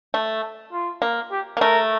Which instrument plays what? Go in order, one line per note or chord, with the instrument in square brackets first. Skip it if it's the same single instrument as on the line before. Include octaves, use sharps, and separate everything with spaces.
[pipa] A3
[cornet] F4
[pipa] A#3
[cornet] G4
[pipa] A#3
[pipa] A3 [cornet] A#4